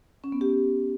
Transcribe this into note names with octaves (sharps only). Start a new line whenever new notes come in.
C#4
B3
G4